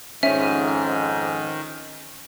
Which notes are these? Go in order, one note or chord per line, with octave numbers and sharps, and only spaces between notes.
F2 G#2 D#3 C#4 E5